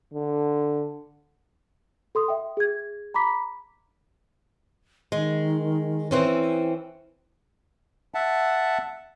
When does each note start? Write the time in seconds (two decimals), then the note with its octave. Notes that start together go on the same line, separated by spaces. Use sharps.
0.14 D3
2.15 A4 C6 D#6
2.28 E5 G5
2.57 G#4 G#6
3.14 A#5 B5 D6 B6
5.12 D#3 G#3
6.11 E3 C4 C#4
8.14 E5 F#5 A5